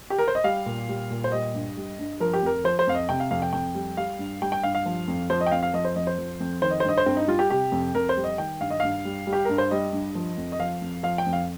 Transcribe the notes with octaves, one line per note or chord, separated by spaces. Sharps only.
G4
A#4
C5
D#5
G3 F5
A#2
G3
A#2
C5
G3 D#5
G2
G3
G2
F3 A#4
G4
F2 A#4
F3 C5
C5
F2 F5
D#5
C3 G5
F5
F2 F5
G5
F2 G5
G3
G3 F5
G2
G3 G5
G5
G2 F5
F5
F3
F2
F3 C5
D#5
G5
F2 F5
F5
F3 D#5
C5
F2 D#5
C5
F3
F2
D#3 C5
D#5
C5
G2 D#5
C5
G2 C4
D#4
G3 F4
G4
C3 G4
F2
F2 A#4
C5
G3
D#5
D#3 G5
G2 F5
D#5
G2 F5
G3
G3
G4
G2 A#4
C5
G3 D#5
G2
F3
F2
D#5
F3 F5
F2
F3 F5
G5
F2
F5